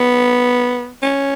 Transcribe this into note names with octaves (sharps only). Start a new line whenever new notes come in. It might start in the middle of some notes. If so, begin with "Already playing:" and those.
Already playing: B3
C#4